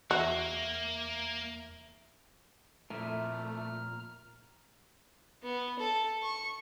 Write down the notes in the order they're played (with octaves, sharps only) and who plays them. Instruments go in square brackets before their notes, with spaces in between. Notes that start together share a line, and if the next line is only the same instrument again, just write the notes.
[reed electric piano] E2 E5 [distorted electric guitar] A#3 [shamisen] F#4
[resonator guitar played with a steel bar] F2 E4 E5 [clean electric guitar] A#2 [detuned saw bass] A3 [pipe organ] A#5 F6
[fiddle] B3
A4
C#6